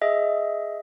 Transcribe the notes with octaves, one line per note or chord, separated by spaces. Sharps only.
G#4 D#5 E5